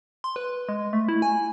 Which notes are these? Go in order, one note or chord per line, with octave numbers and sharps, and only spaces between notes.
C6
B4
G#3
A3
E4
G#5